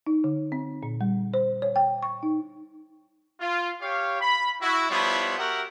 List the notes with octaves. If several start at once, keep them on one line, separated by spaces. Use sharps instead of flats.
D#4
D3
C4
A#2
G3
C5
C#5
G5
C#6
D#4
F4
G4 C#5 F5
B5
E4 F#4
F3 G3 B3 E4 C#5 C6
F#4 G4 A#4 E5 F#5